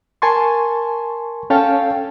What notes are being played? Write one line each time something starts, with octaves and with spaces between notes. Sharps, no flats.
A#4 G#5 A5 C6 C#6
C#4 A4 C#5 F5 G5 A5